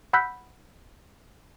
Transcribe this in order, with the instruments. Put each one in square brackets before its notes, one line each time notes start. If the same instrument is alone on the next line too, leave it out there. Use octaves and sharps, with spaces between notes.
[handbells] F#5 B5 E6 F#6 G6 B6